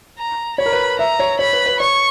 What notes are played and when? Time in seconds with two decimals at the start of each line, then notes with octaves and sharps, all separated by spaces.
0.18 A#5
0.58 C#5 B5
0.66 A#4
0.72 B4
0.99 E5 A#5
1.19 C#5
1.39 C#5 B5
1.53 B4
1.66 B4
1.80 C#5 C#6